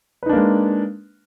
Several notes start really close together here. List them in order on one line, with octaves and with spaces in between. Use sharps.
B4 D#4 D4 A#3 G#3